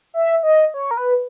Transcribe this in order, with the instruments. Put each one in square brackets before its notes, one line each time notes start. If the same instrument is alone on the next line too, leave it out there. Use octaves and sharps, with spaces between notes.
[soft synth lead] E5
D#5
C#5
A#4
B4